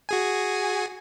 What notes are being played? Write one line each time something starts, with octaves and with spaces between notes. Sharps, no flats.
F#4 G#4 G#5